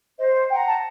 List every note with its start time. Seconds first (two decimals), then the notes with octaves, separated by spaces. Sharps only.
0.19 C5 D#5
0.50 F#5 G5 A#5
0.67 A5